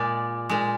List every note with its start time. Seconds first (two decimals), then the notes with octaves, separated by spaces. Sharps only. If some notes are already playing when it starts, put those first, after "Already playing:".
Already playing: A#2 G#3 D5
0.49 A#2 G#3